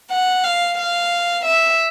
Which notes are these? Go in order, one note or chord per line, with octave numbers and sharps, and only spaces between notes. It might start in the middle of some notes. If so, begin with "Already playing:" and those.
F#5
F5
F5
E5